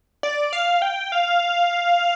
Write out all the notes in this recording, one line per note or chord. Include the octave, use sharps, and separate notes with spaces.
D5
F5
G5
F5